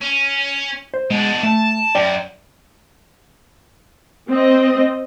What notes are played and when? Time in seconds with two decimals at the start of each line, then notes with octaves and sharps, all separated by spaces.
0.02 C#4
0.94 C5
1.10 B2 G#3 D4
1.43 A3 A5
1.95 F#2 D5 G5
4.29 C4 D#5